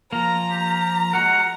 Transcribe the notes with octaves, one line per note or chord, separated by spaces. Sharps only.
F3 A#3 A#4 A#5
G4
G#3 F#4 A#4 F#5